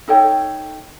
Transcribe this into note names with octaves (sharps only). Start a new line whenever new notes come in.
D#4 A4 C#5 G5